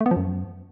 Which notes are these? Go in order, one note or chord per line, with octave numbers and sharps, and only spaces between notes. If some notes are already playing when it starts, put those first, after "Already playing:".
A3
B3
F3
F#2